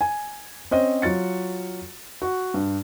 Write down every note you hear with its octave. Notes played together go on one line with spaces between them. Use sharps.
G#5
C4 C#4 C5 D#5
F#3 F4 F#4 A6 C#7
F#4
G2